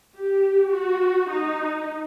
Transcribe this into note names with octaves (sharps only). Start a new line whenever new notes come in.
G4
F#4
D#4